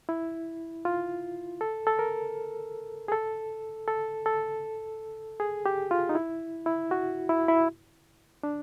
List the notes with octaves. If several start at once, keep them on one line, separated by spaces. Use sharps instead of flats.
E4
F4
A4
A4
A#4
G#4
A4
A4
A4
G#4
G4
F4
D#4
E4
E4
F#4
E4
E4
D4